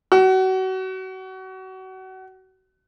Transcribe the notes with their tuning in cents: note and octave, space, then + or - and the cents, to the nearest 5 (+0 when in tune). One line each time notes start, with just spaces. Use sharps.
F#4 +30